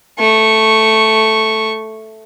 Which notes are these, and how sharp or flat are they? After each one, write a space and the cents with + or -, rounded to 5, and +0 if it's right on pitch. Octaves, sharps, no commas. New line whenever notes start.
A3 +0 C#6 -10